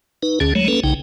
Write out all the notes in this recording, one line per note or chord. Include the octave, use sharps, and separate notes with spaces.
D#4 B4
D2 D3 C#4 G#4
F#3 G#3 A3 C#5
A#3 C#4 A4 B4
B1 C#3 D#4 G5